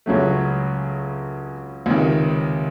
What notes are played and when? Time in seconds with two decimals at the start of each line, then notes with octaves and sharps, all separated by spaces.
0.06 C#2 C#3 F#3 A3
1.86 C#2 C3 D#3